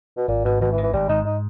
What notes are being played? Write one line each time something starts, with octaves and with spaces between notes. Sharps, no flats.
B2
G#1 A#2
G#2 B2
G#1 B2
E3
D#3
E3
G#1 G3
G#2 D#4
D#4